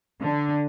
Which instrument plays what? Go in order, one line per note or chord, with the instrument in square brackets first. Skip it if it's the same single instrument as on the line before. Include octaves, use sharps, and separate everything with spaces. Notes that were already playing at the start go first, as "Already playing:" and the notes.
[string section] D3